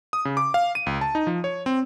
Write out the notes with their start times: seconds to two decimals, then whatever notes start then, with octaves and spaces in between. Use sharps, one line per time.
0.13 D#6
0.25 C#3
0.37 D6
0.54 F5
0.75 D#7
0.86 C#2
1.01 A5
1.15 D#4
1.27 F3
1.44 C#5
1.66 C4